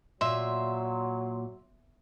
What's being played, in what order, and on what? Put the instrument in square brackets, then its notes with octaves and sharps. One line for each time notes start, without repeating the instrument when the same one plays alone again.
[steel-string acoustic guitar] A#2 [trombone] F#3 [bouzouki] E5 [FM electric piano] C6